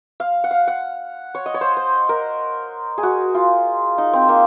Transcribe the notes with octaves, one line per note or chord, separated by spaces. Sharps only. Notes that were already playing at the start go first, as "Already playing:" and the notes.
F5
F#5
F5
F#5
C#5
D#5
C#5
C5
C5
A#4
G#4
F#4
F4
D#4
C4
A#3